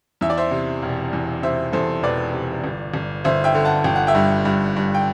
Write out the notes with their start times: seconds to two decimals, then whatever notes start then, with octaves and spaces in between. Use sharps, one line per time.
0.21 E2 E5
0.30 D5
0.37 C5 E5
0.51 C3
0.83 E1
1.13 E2
1.43 C3 C5 E5
1.72 E2 A4 C5
2.03 E1 B4 D5
2.33 C3
2.64 G1
2.94 G1
3.24 G1 C5 E5
3.44 E5 G5
3.55 D3
3.65 F#5 A5
3.84 G1 G5
3.96 F#5
4.07 E5 G5
4.15 G2
4.45 G2
4.76 G2
4.94 G5